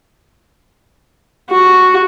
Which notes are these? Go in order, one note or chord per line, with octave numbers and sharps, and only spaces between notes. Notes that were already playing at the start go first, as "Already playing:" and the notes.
F#4